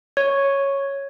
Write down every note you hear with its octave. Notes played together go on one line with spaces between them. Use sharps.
C#5